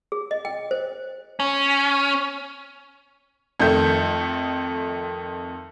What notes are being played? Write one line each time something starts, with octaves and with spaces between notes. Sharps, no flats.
G#4
D#5
G5
C5
C#4
F2 D#3 A3 G6